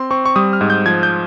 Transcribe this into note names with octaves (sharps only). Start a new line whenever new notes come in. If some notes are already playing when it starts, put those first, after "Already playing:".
Already playing: C4 C6
C4 C#6
C#6
G3 D#6
F6
G#2
G6
F3 G#6
G6